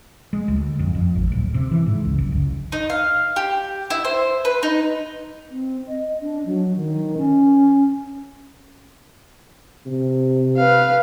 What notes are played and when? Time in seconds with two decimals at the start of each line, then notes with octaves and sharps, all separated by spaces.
0.33 G#3
0.48 D2
0.79 F2
0.95 F2
1.15 G#1
1.32 D1
1.54 C3
1.71 E3
1.86 G#2
2.05 C#2
2.18 F#1
2.32 C#2
2.72 D#4
2.90 F5
3.36 G4
3.90 E4
4.05 C5
4.45 B4
4.63 D#4
5.51 C4
5.88 D#5
6.21 D4
6.46 F#3
6.77 D#3
7.17 C#4
9.86 C3
10.57 B4 F5